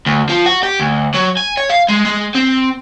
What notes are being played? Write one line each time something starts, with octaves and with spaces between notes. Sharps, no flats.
D2
F3
F#4
G4
D2
F#3
G#5
C#5
F5
G#3
G#3
C4